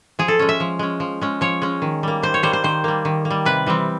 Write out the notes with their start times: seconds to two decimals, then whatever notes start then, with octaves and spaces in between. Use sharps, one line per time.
0.19 F3 G#4
0.28 A4
0.39 G#3 C#4
0.49 E5
0.60 F3
0.79 G#3 C#4
1.00 F3
1.21 G#3 C#4
1.41 F3 C#5
1.62 G#3 C#4
1.82 D#3
2.03 G3 A#3
2.23 D#3 C5
2.34 C#5
2.43 G3 A#3 C5
2.53 C5
2.64 D#3 C5
2.84 G3 A#3
3.05 D#3
3.25 A#3
3.30 G3
3.45 C3 B4
3.66 E3 G3 C4